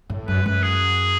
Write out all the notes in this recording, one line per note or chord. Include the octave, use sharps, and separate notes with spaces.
A2
F#2 B4
F#2 B4
G#4